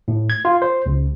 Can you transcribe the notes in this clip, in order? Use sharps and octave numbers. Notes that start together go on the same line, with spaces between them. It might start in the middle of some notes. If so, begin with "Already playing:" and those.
A2
G#6
F4
C5
C#2